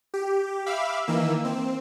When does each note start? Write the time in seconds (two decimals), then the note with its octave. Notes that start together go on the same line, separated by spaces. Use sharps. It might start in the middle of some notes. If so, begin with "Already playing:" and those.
0.14 G4
0.66 E5 F5 B5 D6 E6 F6
1.07 D#3 E3 A#3 E6
1.45 C4